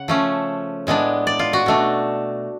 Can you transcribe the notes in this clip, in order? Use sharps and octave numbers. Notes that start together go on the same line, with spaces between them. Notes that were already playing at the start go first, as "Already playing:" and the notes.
Already playing: C#3 F#5
F3 A3 C#4
A2 G#3 B3 D4
D5
F4
F#4
B2 A3 D4